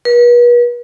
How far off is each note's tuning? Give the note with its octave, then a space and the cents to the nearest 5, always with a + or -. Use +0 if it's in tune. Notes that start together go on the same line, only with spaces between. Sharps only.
B4 -40